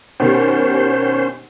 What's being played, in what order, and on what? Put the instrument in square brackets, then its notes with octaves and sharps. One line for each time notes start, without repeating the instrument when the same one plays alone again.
[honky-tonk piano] B2 D#3 G4 [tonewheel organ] C#4 C5